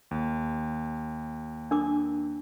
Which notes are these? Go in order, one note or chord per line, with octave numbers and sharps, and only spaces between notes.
D#2
D4 A#4 D6